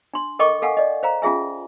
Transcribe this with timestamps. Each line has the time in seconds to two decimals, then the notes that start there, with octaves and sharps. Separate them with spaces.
0.14 D4 C6
0.39 A4 A#4 D#5 G5 C#6 D6
0.62 A4 F5 F#5 G#5
0.77 D5 D#5
1.03 C5 F5 A#5
1.22 C#4 F4 G#4 E5 G#5